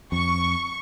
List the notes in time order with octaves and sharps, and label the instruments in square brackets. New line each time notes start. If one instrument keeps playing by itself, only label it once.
[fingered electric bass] F2 [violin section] C#6